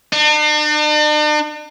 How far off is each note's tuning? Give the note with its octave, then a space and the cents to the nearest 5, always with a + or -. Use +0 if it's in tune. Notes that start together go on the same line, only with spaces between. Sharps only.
D4 +45